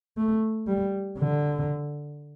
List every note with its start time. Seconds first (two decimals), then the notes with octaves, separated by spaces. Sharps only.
0.17 A3
0.67 G3
1.18 D3